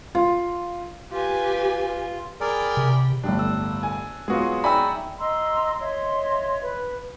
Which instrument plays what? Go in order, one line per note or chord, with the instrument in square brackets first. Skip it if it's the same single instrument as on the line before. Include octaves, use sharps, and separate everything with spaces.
[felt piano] F4
[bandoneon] F4 [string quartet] G4 B4 G#5
[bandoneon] G#4 A#4 D5 [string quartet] G5 B5
[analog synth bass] C3
[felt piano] G1 A2 G3 [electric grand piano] D4
[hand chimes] E6
[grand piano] G#5
[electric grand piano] F#3 F#4 G#4 [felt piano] G#3 B3 F4
[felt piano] D#4 [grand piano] D5 G#5 B5 [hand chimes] E5 G5 E6
[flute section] D#5 A#5 C6 E6
C#5 D#5 E5 C6
B4